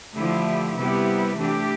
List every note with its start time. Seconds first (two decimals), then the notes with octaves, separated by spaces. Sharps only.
0.16 D3 F3 A3 E4 G4
0.77 C3 G3 B3 E4 G4
1.38 E3 A3 D4 G4